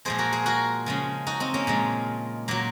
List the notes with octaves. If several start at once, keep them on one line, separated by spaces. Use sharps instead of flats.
A#2 F3 G#3 G#4 C5
F#4 A#4
G#4 C5
F#4 A#4
C#3 F3 G#3
D#4 F#4
C4 D#4
A#3 C#4
A#2 F3 G#3
A#2 F#3 A#3